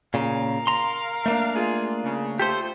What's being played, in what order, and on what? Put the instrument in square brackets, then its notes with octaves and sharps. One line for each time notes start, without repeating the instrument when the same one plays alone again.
[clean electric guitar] A#2 C#3 [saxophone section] A#4 F5
[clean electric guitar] A#5 C6
A3 A#3 D4
[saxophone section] G#3 F4 G#4
C#3
[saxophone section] A3 F4 [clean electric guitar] G4 A4 C5